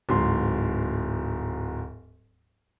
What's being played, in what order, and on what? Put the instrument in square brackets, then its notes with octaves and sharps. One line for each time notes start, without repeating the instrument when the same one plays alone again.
[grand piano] D1 G#2 C6